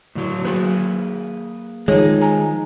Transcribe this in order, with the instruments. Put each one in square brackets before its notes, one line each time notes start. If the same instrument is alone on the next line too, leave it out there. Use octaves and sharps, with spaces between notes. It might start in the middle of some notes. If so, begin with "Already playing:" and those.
[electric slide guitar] A2 D3 F#3
[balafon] F#3 F#4 [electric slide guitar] A#3 G#4 B4
[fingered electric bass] D#3 F3 [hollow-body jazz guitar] G#3 D#4 [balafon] C#5
[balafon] G#5 A#5